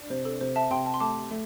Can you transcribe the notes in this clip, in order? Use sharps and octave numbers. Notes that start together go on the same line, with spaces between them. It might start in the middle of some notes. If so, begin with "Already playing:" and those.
Already playing: D4
C3 C5
A4
C3 C5
E5 A5
C3 G5 C6
A5
C6
A3 A5 D6
A3